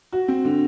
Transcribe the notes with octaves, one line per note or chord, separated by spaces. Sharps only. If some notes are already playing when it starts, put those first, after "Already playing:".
F#4
C4
D3